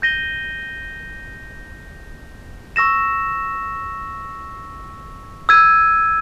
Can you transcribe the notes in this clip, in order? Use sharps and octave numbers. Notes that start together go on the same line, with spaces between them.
G6 A#6 D#7 G7
C#6 E6 A#6 E7
E6 G#6 D#7